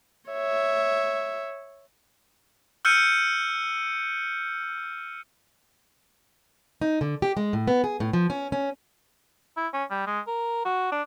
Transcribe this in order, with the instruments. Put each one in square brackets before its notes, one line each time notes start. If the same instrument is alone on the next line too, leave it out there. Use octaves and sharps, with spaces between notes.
[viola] C#5 E5
[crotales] E6 F6 G6 C#7 D#7
[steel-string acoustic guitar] D#4
D3
G4
G#3
A2
B3
G#4
A2
F3
C#4
C#4
[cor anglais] E4
C#4
G3
G#3
A#4
F#4
D4